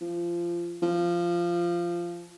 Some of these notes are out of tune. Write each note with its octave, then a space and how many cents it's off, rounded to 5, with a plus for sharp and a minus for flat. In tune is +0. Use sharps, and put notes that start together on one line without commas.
F3 -20
F3 -15